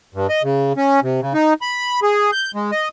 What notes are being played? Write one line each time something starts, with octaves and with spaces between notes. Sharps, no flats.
G2
D#5
C#3
C#4
C3
C#3
D#4
B5
G#4
G6
G#3
D#5